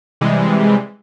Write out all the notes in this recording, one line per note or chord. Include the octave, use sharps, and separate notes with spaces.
C3 E3 G3 G#3